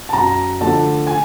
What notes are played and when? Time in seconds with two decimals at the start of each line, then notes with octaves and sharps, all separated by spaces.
0.09 A5
0.13 F#2 A#5
0.61 D3 F3 A3 A5
1.07 G#5